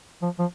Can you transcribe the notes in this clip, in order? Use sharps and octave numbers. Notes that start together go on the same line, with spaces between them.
F3
F3